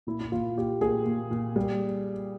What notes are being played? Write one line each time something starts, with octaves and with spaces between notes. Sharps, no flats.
A#2 E4
E4
A#2 F4
A#2 G4
A#2 G#4
A#2
A#2
G3